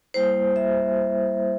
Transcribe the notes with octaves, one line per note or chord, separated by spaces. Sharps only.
G3 A#3 E4 C5
E5